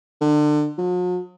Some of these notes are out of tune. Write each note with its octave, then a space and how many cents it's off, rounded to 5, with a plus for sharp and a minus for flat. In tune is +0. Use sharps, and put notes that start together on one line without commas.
D3 +30
F#3 -45